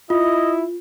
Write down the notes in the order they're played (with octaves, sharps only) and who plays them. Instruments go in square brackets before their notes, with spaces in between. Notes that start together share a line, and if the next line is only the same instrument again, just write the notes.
[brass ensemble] E4 [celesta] F4 [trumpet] D#5